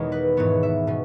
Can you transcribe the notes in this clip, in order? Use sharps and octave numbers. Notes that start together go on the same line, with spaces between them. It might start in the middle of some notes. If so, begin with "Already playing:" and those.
Already playing: E2 B2 D#3 G#3 B3 C#5
B4
G#2 E3 B3 C#5
E5
B2 C#4